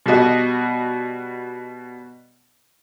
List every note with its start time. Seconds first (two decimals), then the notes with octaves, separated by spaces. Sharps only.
0.06 B2 G3 F#4 D#5